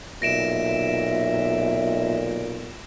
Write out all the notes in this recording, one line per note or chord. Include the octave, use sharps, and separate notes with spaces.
B1 A#2 E5 A#6 D7 E7